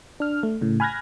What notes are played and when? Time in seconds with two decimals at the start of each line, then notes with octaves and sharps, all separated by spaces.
0.20 D4 F6
0.43 A3
0.61 A2 C#3
0.80 G#5 B5 F6 F#6 G#6 A#6